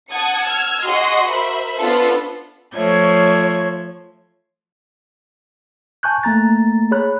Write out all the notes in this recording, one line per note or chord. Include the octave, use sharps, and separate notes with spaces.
F#5 A5 D#6 G#6 C#7
E6 F6 G#6
F#4 G#4 D#5 F#5 C6
A#4 C5 E5 B5
B3 D4 F4 A4 B4 C5
F3 A3 C#5 G#6
G#5 A5 C#6 F#6 G6
A3 A#3 A#5 A6
G#4 C#5 B5 F#6